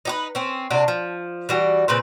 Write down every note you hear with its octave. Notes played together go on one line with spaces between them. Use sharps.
D#4 G4 B4
C4 C#4
C3 D4 F#4
F3
E3 G3 F#4
A#2 C#3 C4 B4